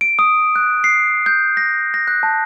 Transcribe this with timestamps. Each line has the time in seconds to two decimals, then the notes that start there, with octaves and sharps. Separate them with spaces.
0.01 D7
0.19 D#6
0.56 F#6
0.84 C7
1.26 G6
1.57 A#6
1.94 A#6
2.08 F#6
2.23 A5